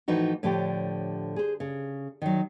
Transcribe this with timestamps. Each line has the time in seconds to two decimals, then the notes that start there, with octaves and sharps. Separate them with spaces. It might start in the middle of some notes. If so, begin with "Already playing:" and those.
0.08 A2 E3 F3 D#4 F#4
0.43 A2 D3 F3 G4 C#5
1.36 G#4 C5
1.60 C#3
2.22 D#3 F#3